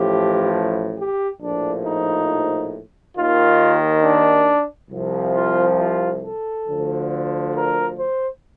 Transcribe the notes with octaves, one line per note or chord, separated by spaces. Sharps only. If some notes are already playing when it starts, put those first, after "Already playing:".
Already playing: A1 A2 F3 G4
G4
A#1 A2 F3 D4
D#4
D#2 D#3 F4
D4
C2 C3 F3
F4
F4
A4
D2 D3 F3
A#4
C5